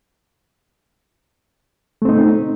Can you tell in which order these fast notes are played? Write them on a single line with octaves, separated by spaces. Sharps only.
A3 C4 D#4